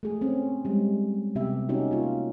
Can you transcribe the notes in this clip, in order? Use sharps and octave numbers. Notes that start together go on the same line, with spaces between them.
A3 G#4
C4 C#4
G3 G#3
C3 B3 G4 E5
C#4 D#4 F#4 G4
A#3 F4